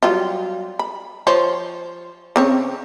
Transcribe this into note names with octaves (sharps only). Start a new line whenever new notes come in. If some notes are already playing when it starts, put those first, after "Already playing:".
F#3 G3 F4
B5
F3 C5 C#5
C#3 C4 C#5